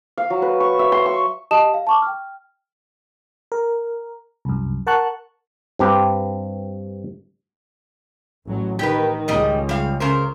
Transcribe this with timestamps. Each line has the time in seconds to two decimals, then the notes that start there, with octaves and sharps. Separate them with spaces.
0.18 F5
0.30 F#3
0.42 B4
0.60 C#6
0.79 E5
0.92 C6
1.06 C#6
1.51 G4 D#5 A5 D#6 E7
1.74 F5
1.87 A5 C#6 D6
2.02 G5 F6
3.52 A#4
4.45 C2 F#2
4.87 A#4 F#5 A5 C#6 F#6
5.79 G2 C4 G4 B4
8.47 A1 F#3
8.79 D#3 G4 B4
9.28 C#2 D#3 G3 D#5
9.69 G3 F5
10.00 C#3 A#4 C5